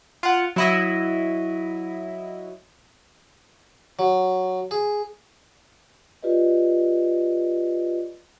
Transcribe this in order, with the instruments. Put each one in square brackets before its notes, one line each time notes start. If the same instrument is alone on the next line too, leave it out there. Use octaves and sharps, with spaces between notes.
[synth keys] F4 F#5
F#3 E4 D#5
[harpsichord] F#3
G#4
[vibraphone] F4 G4 B4 D5 D#5